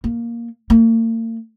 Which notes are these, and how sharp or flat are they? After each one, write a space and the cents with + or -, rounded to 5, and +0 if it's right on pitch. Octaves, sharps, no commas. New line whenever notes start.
A#3 +5
A#3 -45